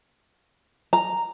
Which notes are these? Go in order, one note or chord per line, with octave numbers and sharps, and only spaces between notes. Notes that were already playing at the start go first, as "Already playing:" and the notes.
A#5